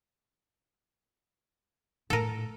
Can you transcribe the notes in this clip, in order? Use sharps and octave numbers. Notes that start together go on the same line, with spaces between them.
A2 A4 A#4